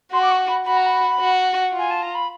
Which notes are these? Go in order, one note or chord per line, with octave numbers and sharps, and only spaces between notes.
F#4 C6
D6
C#6
B5
F#4 B5
A#5
B5
F#4
F4
G#5
A5
A#5
B5